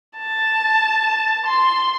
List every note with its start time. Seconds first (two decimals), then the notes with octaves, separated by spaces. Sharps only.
0.17 A5
1.46 C6